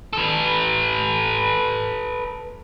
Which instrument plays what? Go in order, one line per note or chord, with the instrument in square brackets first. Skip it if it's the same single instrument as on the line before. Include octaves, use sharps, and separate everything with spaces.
[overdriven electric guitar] A4 B4